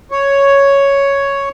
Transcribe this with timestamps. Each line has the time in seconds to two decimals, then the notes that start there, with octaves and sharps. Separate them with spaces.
0.11 C#5